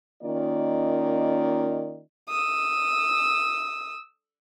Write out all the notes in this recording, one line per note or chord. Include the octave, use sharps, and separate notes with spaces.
D#3 A#3 C#4 F4 D5 D#5
D#6 E6